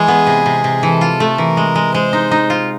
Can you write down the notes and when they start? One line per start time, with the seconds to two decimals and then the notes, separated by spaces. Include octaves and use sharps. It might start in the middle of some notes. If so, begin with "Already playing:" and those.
Already playing: E3 G#3 G#4
0.08 B3
0.27 C3
0.46 C3
0.64 C3
0.83 E3 A4
1.01 F4
1.20 A3
1.38 E3 A#4
1.57 G#3
1.76 G#3
1.94 G#3 C5
2.13 D#4
2.31 D#4
2.50 F4